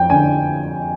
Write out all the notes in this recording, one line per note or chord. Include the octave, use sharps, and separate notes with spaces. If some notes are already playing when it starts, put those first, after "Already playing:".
Already playing: F2 G5
D3 G#5